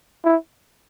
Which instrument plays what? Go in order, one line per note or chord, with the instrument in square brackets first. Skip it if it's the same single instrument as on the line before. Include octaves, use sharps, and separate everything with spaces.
[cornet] E4